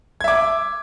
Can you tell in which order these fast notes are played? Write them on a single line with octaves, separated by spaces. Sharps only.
G#6 E5 D6